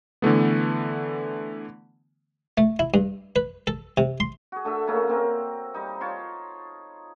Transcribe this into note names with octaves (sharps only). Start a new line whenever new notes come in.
D3 E3 A3 B3
A3
E4
G2
B4
A4
C3
C6
F#4 G#4
D3 A3 A4 E5
C#3 A3 A#3 C#4
A#3 C4 A#4
G3 D#4
F4 C#5 A5 C6